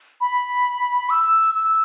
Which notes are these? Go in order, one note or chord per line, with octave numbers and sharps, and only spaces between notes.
B5
E6
E6